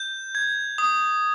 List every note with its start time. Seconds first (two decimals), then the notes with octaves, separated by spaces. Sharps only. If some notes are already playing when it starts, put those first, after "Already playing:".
Already playing: G6
0.35 G#6
0.78 D#6